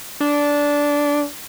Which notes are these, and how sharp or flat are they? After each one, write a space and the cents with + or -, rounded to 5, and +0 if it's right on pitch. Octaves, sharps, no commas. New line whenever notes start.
D4 -15